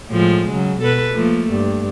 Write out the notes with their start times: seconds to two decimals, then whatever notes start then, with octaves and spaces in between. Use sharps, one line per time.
0.10 A2 F3 G#3
0.51 C#3 F#3
0.81 B2 A4 B4
1.14 F3 A3 A#3
1.51 G2